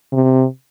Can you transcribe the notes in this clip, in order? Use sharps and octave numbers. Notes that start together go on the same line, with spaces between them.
C3